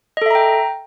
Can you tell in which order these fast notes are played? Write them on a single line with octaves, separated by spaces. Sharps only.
D#5 A4 E5 A#5 G5